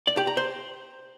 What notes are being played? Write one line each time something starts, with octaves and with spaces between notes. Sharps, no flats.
D5
G4
A#5
C5